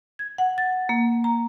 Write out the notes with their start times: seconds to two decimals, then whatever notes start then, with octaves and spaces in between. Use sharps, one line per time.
0.19 G#6
0.38 F#5
0.58 A6
0.89 A#3
1.24 A#5